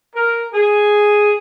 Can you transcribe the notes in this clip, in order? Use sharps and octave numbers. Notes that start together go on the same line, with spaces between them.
A#4
G#4